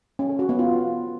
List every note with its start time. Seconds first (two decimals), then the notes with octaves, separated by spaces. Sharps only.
0.19 C#4
0.29 A4
0.39 F#4
0.49 B3
0.59 F4